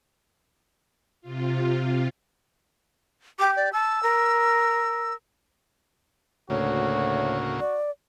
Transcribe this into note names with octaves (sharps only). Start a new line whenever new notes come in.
C3 F4
G4 D6
D5
A5 E6
A#4
D2 A2 C#3 A#3 F#4 C#5
D5